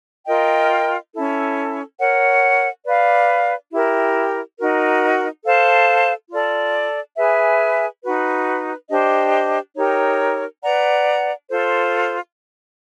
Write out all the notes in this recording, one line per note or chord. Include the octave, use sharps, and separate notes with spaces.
F4 A#4 D#5 G5
C#4 E4 A4
A#4 C#5 F#5
B4 D5 F5
E4 G4 A#4
D#4 F#4 A#4
A4 C5 F5 A5
F4 A4 D5
G#4 B4 E5 G#5
D#4 F#4 B4
D4 G4 C5 D#5
D#4 G4 A#4 C#5
B4 D5 F#5 A#5
F4 A4 C5